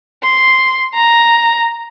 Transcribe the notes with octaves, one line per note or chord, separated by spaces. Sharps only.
C6
A#5